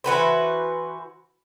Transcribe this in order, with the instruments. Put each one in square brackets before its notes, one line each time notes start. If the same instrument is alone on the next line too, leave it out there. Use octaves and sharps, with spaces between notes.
[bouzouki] E3 F#4 B4 C5